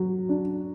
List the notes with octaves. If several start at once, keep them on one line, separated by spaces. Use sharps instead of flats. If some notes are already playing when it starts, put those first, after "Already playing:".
Already playing: F#3
D4